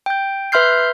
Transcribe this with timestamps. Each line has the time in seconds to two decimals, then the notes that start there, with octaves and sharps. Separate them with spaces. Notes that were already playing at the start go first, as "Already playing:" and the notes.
0.06 G5 G6
0.52 B4 E5 C6 F6 G6 C7